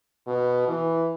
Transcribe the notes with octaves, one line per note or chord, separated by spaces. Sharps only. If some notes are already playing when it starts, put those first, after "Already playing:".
B2
E3